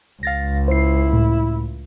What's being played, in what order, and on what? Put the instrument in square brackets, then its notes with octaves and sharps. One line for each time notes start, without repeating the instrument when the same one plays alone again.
[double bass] C#2 [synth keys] F5 A6 A#6
[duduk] E4 [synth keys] C5 C7
[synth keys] A2